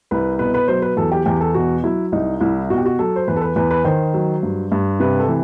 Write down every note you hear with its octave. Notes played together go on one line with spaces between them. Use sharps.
C2 B4
B2 B4
B4
F#3 C5
B4
E2 A4
G4
E2 G4
A4
B2 F#4
F#3 E4
C2 D#4
C2 E4
B2 F#4
G4
F#4
F#3 A4
C5
E2 B4
A4
B4
E2 B4
B4
D#3 C5
F#3
G2
G2
C3 B4
A4
E3